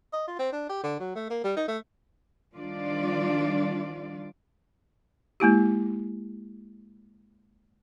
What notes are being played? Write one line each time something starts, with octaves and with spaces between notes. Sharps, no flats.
D#5
F4
C4
D4
G4
D3
F#3
A3
A#3
G3
D#4
A3
D#3 F3 G3 D4 F4 D5
G#3 A#3 E4 G4